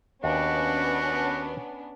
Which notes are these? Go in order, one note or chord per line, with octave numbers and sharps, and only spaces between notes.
D#2 B3 C#4 D4 F#4